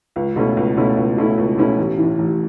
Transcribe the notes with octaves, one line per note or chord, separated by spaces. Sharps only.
C#2
B2 A3 C#4 E4
C#2
B2 A3 C#4 E4
C#2
B2 A3 C#4 E4
C#2
B2 A3 C#4 E4
A1
A2 E3
A1